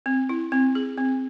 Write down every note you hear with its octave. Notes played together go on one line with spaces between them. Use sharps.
C4
E4
C4
G#4
C4